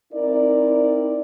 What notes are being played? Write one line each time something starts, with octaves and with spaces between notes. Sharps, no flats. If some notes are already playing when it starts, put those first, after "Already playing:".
C4 D#4 E4 A#4 D5